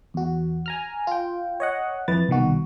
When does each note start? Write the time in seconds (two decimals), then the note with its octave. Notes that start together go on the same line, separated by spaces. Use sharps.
0.14 E2 F#4
0.66 G#5 A#5 F6
1.07 F4 G5
1.60 C#5 D#5 F#5
2.08 F2 E3 B4 A6
2.28 C2 B2 D#3 F#4